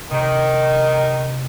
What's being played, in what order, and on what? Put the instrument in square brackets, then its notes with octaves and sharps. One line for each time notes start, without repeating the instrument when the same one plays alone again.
[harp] C3 [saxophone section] D#3